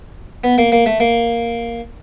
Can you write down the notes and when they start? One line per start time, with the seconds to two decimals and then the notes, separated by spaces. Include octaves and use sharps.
0.44 B3
0.58 A#3
0.72 A#3
0.86 A3
1.00 A#3